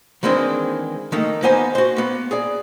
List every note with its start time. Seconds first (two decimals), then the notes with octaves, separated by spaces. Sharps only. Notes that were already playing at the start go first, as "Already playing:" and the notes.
0.23 D#3 E3 G#3 A#3 C4 D4
1.12 D#3 A3 A#3 D#4
1.43 A#3 B3 D#4 C5 G#5
1.75 F#4 C5
1.96 A#3 B3
2.31 G#4 D5